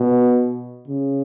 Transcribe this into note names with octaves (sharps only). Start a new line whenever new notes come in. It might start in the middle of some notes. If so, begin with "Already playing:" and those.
Already playing: B2
C#3